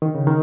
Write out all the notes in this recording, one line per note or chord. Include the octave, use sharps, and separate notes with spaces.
D#3
C#3
D#3